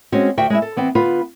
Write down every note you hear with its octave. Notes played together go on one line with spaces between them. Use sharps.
G#3 C4 C#4 F#4
D2 F#4 E5 G5
G#3 E4 E5
A4
E3 B3 C4
D3 B3 F4 B4